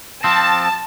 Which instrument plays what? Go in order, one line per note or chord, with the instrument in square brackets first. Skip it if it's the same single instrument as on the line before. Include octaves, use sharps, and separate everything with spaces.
[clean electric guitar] F3 C4 [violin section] A5